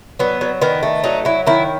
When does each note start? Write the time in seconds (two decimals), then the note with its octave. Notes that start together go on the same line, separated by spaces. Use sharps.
0.19 F#3 B3
0.41 F#3
0.62 D#3 B3
0.83 A3
1.04 F#3 D#4
1.25 F#3 E4
1.47 D#3 E4